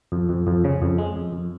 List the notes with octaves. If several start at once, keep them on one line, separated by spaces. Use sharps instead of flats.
F2
F2
F2
C#3
F2
G#3
F2
F2